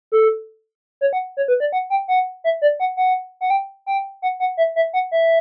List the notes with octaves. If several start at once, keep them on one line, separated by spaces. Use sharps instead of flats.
A4
C#5
F#5
C#5
B4
D5
F#5
G5
F#5
E5
D5
F#5
F#5
F#5
G5
G5
F#5
F#5
E5
E5
F#5
E5